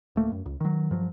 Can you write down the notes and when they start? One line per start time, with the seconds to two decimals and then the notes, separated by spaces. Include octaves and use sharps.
0.16 D1 A3 A#3
0.32 F#2
0.46 C#2
0.60 D#3 F#3
0.91 G2 F3 F#3